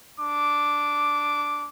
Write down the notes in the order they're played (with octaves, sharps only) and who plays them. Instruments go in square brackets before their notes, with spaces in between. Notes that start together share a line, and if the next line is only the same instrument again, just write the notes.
[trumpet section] D4 D6